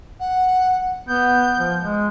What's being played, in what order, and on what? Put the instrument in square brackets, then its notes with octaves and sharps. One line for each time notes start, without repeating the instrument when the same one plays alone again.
[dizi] F#5
[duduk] B3 [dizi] G6
[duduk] F3
G#3